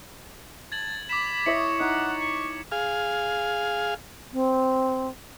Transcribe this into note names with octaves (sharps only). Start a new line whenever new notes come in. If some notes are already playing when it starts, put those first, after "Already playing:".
A5 G#6 A6 F#7
B5 D6 B6 E7
E4 C#5 D#5 C#7
D#4 F#5
C#6
G#4 F5
C4